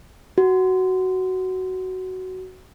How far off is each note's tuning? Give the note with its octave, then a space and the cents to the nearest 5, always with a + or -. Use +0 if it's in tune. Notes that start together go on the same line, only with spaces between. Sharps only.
F#4 +10